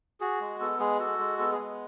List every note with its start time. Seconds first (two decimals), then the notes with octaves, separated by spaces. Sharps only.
0.20 F#4 G#4
0.41 G#3
0.60 B3 A4
0.79 G#3 G#4
0.99 F#4 A4
1.19 G#3
1.39 B3 A4
1.52 G#4
1.59 G#3